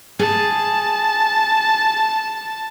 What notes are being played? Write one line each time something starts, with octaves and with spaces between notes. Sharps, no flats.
G#4 A5